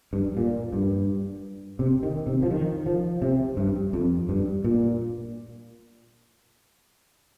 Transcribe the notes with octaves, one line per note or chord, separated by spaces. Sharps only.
G2
A#2
G2
C3
D#3
C3
F3
D#3
F3
C3
G2
F2
G2
A#2